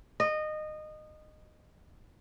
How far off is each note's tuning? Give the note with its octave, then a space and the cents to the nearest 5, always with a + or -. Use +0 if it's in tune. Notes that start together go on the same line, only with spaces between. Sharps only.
D#5 -20